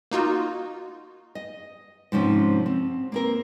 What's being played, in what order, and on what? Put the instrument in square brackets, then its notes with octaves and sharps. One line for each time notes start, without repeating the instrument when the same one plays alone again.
[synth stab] A#3 D#4 F4 F#4
[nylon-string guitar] D#5
G#2 C3 F3 C#4
C4
A#3 C4 A#4